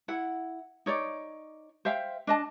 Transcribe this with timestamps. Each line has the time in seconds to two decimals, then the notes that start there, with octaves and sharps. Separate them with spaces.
0.08 E4 F#5
0.86 D#4 C#5 D5
1.85 C5 E5 F5 G5
2.27 D4 D#5 A5